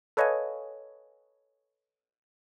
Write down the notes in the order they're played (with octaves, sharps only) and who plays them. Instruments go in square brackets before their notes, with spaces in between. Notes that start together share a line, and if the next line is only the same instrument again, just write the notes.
[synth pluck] A4 B4 C#5 D#5 F5 G#5